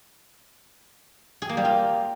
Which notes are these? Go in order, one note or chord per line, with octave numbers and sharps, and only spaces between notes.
G#4
A#3
G3
F4